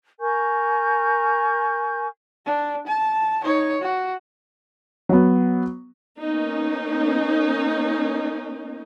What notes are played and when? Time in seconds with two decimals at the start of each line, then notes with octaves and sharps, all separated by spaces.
0.19 A#4 G#5 C#6 G6
2.46 D4
2.87 A5
3.43 D#4 C#5
3.81 F#4
5.09 F#3 B3
6.19 A#3 B3 C#4 D#4